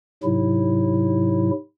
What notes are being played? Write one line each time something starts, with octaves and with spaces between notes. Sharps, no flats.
G#2 C3 F#3 E4